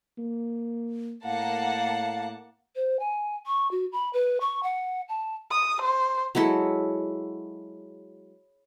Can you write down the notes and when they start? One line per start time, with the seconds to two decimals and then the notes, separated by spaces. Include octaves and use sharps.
0.18 A#3
1.25 A2 A#3 F5 F#5 A5
2.76 C5
3.00 G#5
3.47 C#6
3.71 F#4
3.92 B5
4.13 B4
4.41 C#6
4.63 F#5
5.09 A5
5.51 D#6
5.82 C5
6.35 F#3 G#3 E4 A4